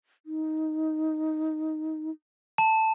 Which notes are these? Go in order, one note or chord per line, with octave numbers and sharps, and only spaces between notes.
D#4
A5